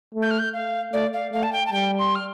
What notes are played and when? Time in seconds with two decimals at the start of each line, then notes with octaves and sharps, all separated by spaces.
0.14 A3
0.22 G6
0.31 F6
0.39 G6
0.53 F5
0.93 A3 D5
1.13 F5
1.32 A3 F5
1.43 A5
1.52 G5
1.66 A5
1.72 G3 G5
1.99 C6
2.15 F6